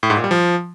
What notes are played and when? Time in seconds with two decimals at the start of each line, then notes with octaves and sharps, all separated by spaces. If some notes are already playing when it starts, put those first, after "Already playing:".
0.03 A2
0.10 G#2
0.17 A#2
0.24 G3
0.31 F3